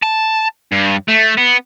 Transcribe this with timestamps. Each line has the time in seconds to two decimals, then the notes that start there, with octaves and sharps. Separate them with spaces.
0.02 A5
0.72 G2
1.09 A3
1.37 B3